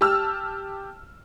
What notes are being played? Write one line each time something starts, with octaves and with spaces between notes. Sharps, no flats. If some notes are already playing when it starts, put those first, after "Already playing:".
G4 A5 E6 F6